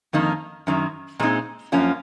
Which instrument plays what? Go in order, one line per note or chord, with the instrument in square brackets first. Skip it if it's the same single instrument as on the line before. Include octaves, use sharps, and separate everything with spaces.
[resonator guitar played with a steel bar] F2 D#3 A#3 D#4
F#2 D#3 F#3
A#2 G#3 C4 D#4
F#2 F3 A#3 C#4 F4